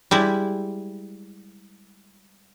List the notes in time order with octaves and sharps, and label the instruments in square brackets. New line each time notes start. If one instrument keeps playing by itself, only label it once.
[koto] G3 G#3 E4